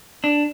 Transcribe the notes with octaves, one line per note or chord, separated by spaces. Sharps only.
D4